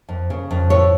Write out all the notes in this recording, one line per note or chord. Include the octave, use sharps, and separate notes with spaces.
F2
C#3
F2
A2 C#5